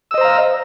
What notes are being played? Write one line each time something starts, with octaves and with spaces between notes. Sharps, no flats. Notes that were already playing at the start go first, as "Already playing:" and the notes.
C5 D#5 F5 A#5 E6